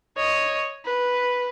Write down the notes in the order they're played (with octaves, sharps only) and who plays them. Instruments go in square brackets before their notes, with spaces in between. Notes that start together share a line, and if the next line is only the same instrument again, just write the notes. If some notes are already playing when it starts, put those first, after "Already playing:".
[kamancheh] C#5 D#5
B4